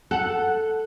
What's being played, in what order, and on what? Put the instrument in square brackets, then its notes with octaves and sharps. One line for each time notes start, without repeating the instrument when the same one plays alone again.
[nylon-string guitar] A4 [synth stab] F#5 F#6